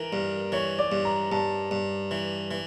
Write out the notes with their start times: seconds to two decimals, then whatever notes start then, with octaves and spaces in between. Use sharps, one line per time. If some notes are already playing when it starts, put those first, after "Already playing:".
Already playing: E3 A#4
0.13 G2
0.52 E3 C#5
0.79 D5
0.92 G2
1.05 A#5
1.32 G2 A5
1.71 G2
2.11 E3
2.51 E3